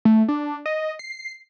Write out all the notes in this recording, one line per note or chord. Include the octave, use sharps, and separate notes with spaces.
A3
D4
D#5
C7